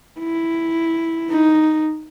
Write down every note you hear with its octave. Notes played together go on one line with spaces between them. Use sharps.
E4
D#4